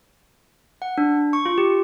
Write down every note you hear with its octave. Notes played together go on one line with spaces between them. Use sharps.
F#5
D4
C#6
F4
G4